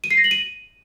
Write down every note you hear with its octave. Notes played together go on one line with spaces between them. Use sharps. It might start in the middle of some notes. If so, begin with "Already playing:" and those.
D#7
C7
A#6
F#7
D#7